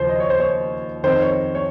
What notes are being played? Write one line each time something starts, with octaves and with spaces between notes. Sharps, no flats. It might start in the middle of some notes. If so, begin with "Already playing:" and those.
Already playing: D#2 C#3 F3 C5
D#5
C#5
C5
C#5
F2 D#3 C5
C#5
C#5